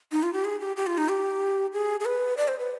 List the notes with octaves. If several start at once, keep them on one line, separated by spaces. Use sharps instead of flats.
D#4
F4
G4
G#4
G4
G4
F4
D#4
G4
G#4
G#4
B4
D5
C5
B4